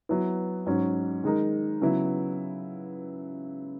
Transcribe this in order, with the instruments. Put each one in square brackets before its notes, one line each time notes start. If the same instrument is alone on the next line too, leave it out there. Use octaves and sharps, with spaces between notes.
[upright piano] F#3 B3 E4
G#2 F#3 C#4
D#3 G#3 D#4 A#4
C#3 F#3 B3 E4